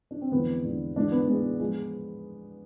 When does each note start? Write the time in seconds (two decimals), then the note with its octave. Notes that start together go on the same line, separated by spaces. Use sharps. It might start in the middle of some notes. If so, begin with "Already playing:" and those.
0.11 D4
0.22 C4
0.31 E2 D3 F3 G#3 B3
0.63 E2 D3 F3 G#3
0.96 G#2 E3 G#3 D4
1.12 B3
1.27 G#2 E3 G#3 B3
1.60 F3 G#3